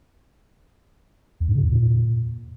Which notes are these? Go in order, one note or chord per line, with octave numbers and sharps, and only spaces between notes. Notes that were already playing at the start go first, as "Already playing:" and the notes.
E2
G#2
C#3
E2
A#2